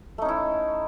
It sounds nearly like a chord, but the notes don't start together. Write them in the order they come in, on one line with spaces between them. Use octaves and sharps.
A3 D#4 C#4 E4